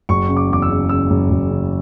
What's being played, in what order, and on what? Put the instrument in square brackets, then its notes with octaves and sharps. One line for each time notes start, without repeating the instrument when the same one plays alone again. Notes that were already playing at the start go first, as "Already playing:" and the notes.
[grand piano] F#1 C#6
C#3
D6
E2 D6
E6
C#3
C#3 E6
F#1
F#1
C#3